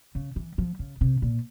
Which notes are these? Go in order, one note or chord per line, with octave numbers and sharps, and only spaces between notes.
C#3
E3
F3
C#3
C3
A#2